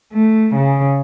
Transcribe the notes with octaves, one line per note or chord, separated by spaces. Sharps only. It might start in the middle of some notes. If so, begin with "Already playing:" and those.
A3
C#3